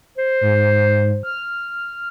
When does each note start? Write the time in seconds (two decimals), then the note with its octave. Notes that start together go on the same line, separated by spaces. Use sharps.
0.18 C5
0.41 G#2
1.23 F6